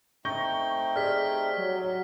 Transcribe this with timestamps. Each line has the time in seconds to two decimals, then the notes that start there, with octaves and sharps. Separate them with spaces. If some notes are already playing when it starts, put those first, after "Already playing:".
0.25 A3 C4 D#4 C#6 G6 A#6 G7
0.96 G4 G#4 D5 F6 B6
1.58 F#3